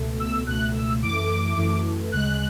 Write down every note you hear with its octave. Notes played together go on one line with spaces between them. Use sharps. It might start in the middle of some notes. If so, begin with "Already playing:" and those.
Already playing: C#2 B2 A3
E6
C#2 B2 A3 F#6
E6
F#2 E3 A3 D6
F#2 E3 A3
D2 C#3 G#3 F#6